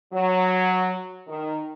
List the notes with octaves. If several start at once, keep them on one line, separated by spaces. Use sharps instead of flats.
F#3
D#3